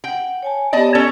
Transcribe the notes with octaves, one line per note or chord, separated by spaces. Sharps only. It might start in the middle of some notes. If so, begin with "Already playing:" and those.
F#5 G5
C#5 G#5 A5
B3 G4 D5 D#5 A5
C#4 A4 C#5